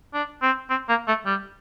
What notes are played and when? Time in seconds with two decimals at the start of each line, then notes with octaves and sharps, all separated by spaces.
0.14 D4
0.42 C4
0.70 C4
0.89 A#3
1.08 A3
1.26 G3